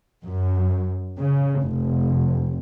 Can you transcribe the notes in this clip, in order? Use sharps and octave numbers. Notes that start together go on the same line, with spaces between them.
F#2
C#3
F1